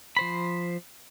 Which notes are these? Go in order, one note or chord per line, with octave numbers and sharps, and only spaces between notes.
F3 C5 B5